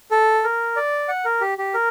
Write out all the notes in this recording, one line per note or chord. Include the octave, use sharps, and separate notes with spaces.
A4
A#4
D5
F#5
A#4
G4
G4
A#4